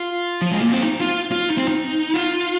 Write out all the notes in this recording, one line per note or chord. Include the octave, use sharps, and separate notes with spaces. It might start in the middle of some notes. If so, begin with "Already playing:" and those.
Already playing: F4
F3
G#3
A#3
C4
D#4
F4
F4
D#4
C4
D#4
F4